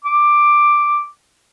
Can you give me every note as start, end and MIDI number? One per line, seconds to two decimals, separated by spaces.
0.04 1.05 86